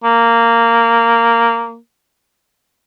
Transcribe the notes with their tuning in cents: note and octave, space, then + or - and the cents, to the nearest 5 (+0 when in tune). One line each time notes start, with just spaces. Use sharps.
A#3 -10